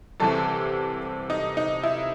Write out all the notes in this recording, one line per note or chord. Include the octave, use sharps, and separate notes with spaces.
C2 C3 E3 A4
D#4
D#4
E4